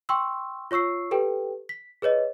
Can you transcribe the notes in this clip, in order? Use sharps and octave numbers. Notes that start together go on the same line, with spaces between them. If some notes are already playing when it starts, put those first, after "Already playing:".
G5 C6 C#6 E6
F4 C#5 C#6 E6 C7
G4 A4 B4 G5
B6
G#4 B4 C#5 D#5